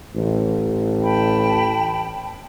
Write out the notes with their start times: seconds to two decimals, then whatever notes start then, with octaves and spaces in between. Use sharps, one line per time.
0.16 A1
1.03 G5 A5 B5